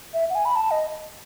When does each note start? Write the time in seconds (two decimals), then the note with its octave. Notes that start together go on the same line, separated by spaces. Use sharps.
0.14 E5
0.30 F#5
0.35 G#5
0.45 B5
0.56 A5
0.71 D#5